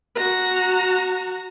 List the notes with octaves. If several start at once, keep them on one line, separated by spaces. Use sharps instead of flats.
F#4 A#5